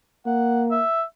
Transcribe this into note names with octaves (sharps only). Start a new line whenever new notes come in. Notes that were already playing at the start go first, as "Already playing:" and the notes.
A#3 F#5
E5